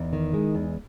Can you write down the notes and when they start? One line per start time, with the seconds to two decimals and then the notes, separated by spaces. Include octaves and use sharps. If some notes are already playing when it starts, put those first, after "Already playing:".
Already playing: E2 D#4
0.13 D#3
0.34 G#3
0.55 E2